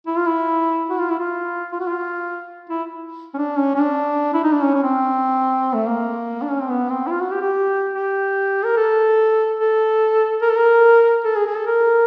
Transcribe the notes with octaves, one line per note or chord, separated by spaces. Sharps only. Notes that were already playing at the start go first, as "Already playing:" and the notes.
E4
F4
E4
F#4
F4
E4
F4
F4
F#4
F4
E4
C#4
D4
C#4
C#4
D4
E4
D#4
D4
C#4
C#4
C4
A3
A#3
D4
C#4
C4
B3
C4
E4
F4
F#4
G4
G4
G4
A#4
A4
A4
A#4
A4
A#4
A4
G#4
G#4
A4
A#4